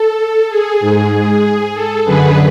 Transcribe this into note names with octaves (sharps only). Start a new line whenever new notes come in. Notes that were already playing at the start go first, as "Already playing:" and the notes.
Already playing: A4
G#4
G#2
G#4
A4
F#2 D3 G#4 B4